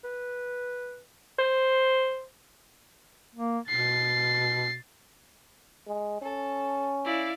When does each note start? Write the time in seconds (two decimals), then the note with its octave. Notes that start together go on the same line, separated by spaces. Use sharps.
0.04 B4
1.39 C5
3.35 A#3
3.69 B2 A6 C7
5.87 G#3
6.21 C#4 A4
7.04 E4 D5 F5